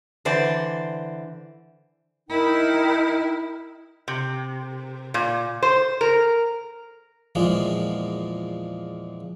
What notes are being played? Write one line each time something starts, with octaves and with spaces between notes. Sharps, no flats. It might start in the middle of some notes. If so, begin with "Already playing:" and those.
D3 E3 C5 D5
D#4 E4 A#4 G5
C3
A#2
C5
A#4
E2 A#2 F3 G#3 A#3